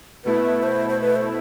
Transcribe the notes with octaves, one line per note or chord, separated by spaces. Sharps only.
B2 A3 E4 B4
C5
C5
B4
C5